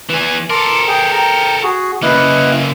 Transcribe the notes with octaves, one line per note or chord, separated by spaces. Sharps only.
E3 G#4
A4 A#4 A5 C6 D6
G#4 G5
G5 A#5
F#4 G#4
C#3 A#3 E4 B4 D#5